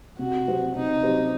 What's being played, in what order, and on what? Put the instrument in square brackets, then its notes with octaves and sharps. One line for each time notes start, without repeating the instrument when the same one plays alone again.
[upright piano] C3 [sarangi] F#4
[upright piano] F#3 C4 G4 C5
[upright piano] C3 [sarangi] D#4
[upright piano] F#3 C4 G4 C5